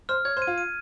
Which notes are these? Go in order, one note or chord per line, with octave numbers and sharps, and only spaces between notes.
C5 F6
C#5 G#6
C5
D#7
F4
D#7